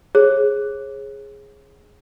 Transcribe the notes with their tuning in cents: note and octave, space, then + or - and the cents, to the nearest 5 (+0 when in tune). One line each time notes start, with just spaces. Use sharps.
G#4 +0 C#5 -35